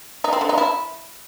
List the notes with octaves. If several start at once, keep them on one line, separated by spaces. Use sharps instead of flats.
D#4
C4
D3
D#4
E4